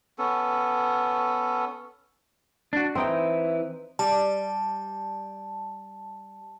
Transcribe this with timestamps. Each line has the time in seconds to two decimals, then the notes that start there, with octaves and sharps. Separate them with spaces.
0.18 B3 C#4 A4
2.73 D4 F#4
2.95 E3 C4 D#4 E4 G5
3.99 G3 A5